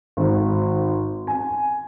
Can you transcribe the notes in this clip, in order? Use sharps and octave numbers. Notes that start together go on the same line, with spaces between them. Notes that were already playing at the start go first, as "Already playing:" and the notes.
G#1
G#5